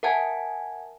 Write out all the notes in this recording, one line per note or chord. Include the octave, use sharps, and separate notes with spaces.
A#4 E5 F#5 G#5 A5 G#6